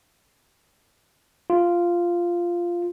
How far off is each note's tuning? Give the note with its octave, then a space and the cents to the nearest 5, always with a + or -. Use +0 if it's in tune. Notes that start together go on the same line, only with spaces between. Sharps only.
F4 -5